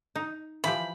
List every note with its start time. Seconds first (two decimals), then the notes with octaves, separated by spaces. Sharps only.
0.16 D#4
0.64 E3 F3 G4 B5